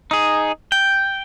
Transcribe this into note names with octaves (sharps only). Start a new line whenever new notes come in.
D#4 G#4
G5